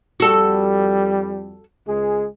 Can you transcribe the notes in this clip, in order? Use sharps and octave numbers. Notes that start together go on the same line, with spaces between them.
F2 G3 F#4 A4
C#2 G#3 G#4